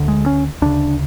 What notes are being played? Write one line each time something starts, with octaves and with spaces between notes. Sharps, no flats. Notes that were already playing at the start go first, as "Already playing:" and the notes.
Already playing: D2 D3
G#3
C#4
D2 C#3 D4